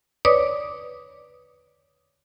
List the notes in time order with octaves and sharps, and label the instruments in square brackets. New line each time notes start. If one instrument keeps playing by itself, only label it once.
[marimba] B4 C#5 D5 D6 D#6